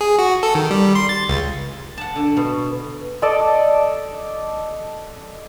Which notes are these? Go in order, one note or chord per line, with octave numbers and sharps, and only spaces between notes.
G#4
F#4
A4
D#3
G3
C6
A6
C#2
F#5 A5
D3
B2
A4 D5 D#5 A5